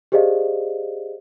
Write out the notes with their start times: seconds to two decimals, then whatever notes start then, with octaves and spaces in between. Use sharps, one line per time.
0.12 G4 G#4 C5 D5 D#5 F5